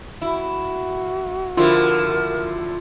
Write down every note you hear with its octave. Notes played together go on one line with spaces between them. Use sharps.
E4 F#4
D3 F3 E4 F4 A#4